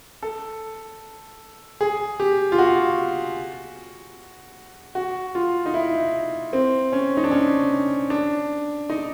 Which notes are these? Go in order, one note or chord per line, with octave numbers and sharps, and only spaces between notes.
A4
G#4
G4
F4
F#4
F#4
F4
D#4
E4
C4
C#4
D#4
D4
C#4
D4
D#4